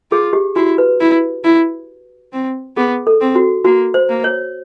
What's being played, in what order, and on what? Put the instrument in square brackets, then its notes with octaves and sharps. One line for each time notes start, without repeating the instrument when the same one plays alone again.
[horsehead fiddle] F4 [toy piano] G#4
[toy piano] G4
[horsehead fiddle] E4 [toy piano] F#4
[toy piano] B4
[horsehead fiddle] E4
E4
C4
[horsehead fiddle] B3 [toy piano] G#4
[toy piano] A4
[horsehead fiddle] C4
[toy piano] F#4
[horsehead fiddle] A#3 [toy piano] F#4
[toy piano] C5
[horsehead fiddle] A#3
[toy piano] C#5